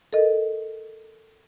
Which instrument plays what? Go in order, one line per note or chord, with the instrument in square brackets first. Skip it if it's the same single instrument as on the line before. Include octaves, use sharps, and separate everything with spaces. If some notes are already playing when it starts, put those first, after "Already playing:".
[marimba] A4 A#4 D#5